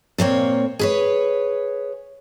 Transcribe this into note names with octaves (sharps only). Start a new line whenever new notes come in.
A#2 A#3 C4 C#5
G#4 B4 C#5